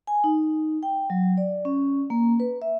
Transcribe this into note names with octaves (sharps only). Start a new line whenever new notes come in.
G#5
D#4
G5
F#3
D5
C#4
A#3
B4
E5